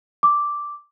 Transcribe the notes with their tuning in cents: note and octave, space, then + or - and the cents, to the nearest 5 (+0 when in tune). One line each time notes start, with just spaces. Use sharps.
D6 -5